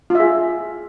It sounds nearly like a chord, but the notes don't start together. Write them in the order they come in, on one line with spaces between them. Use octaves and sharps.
F4 E5 G#4